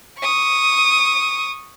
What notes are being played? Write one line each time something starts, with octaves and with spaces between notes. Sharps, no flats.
C#6 D#6